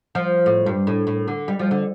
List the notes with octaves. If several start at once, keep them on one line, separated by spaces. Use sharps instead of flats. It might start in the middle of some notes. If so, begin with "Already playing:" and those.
F3
A2
G2
A2
A2
D3
G3
F3
D3